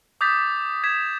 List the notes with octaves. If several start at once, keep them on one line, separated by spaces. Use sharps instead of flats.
D6 D#6 G6 A6 B6
G#6 B6 E7